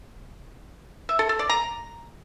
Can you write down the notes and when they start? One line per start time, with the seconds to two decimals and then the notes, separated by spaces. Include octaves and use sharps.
1.09 E5
1.19 A4
1.29 A4
1.39 D5
1.49 A#5